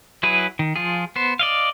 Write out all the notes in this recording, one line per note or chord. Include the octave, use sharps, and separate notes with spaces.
F#3 E4 G#4 B4
D#3
F3 F4 G#4
B3 C5
D5 D#5 F5